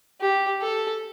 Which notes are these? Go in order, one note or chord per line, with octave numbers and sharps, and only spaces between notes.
G4
A4